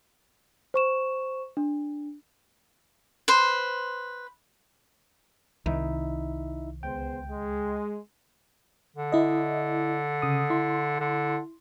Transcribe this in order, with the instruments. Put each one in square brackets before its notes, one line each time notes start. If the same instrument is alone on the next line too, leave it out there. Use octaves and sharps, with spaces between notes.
[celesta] C5 C#6 E7
D4
[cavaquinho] B4 C5
[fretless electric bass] C2 D#3 [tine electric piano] D#4 E4 E5
[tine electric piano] C#2 G5 [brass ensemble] B3 G#4 C5
[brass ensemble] G#3
[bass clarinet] D3
[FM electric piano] E4 D#5
C#3 D#6
E4 C6
[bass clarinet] D3